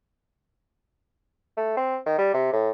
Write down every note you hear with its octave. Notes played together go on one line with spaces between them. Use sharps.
A3
C4
D#3
G3
C3
A2